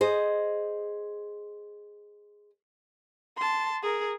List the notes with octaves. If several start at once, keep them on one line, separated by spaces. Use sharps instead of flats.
G#4 C5 D#5
A5 C6
G#4 A#4